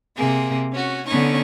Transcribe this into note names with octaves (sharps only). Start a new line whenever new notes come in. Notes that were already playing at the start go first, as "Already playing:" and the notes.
C3 A#3 G#4
C#4 F#4
D3 B3 C#4 D#4 C#6